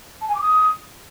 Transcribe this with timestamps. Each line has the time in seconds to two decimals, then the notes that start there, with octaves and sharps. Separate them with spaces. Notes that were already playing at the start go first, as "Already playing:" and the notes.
0.21 A5
0.28 G#5
0.35 D6
0.42 D#6